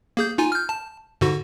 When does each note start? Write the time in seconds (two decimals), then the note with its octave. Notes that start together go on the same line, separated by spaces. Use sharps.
0.17 A#3 G#4 G6
0.38 D#4 F4 G#5
0.52 F6 G6
0.69 A5
1.21 G#2 D3 F#4